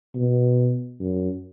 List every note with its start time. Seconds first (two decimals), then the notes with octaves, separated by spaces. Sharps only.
0.15 B2
1.00 F#2